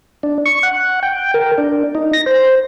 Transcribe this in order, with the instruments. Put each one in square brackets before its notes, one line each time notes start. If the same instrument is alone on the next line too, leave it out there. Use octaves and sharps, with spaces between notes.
[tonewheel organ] D4
C#6
F#5
G5
A#4
D4
D#4
A#6
C5